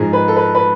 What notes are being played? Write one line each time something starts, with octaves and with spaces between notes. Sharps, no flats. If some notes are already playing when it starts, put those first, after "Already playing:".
Already playing: G#2 F3 G#3 G#4
B4
A4
B4
B4